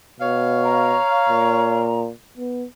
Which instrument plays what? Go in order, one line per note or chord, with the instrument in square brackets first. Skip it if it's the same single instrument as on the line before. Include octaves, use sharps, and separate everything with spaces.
[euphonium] B2 [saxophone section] C#5 F5
[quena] A#5
[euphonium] A#2
B3